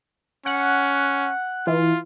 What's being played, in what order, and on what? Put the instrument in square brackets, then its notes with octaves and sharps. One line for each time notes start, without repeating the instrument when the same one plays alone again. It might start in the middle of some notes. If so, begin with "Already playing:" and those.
[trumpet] C#4 [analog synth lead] F#5
[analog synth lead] E3 [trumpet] F4